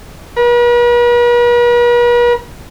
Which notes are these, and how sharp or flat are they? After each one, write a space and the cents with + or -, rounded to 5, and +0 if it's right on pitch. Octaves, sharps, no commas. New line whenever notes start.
B4 -45